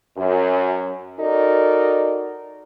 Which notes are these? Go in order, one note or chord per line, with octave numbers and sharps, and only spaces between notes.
F#2
D#4 F#4 A4 A#4 D5